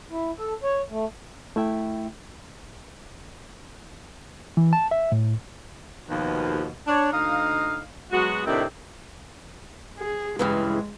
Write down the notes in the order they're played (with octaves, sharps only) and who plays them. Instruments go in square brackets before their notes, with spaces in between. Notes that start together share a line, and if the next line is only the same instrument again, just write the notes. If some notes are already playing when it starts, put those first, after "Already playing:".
[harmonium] E4
A4
C#5
A3
[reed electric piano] A3 E4 E5 G5
E3
A5
E5
A2
[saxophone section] D#2 B2 F3
D4 C#5
D2 D#4 D#5 F5
F#3 G#3 B3 F#4
A2 C3 D#3 C4 D4 E4
[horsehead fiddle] G#4
[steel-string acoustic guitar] G2 C#3 E3 [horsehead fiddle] G#3